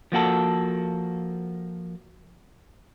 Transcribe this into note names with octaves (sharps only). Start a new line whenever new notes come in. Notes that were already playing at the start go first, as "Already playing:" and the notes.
F3 A#3 F#4 A4